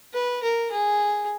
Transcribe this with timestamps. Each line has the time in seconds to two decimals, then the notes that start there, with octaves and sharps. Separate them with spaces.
0.14 B4
0.43 A#4
0.72 G#4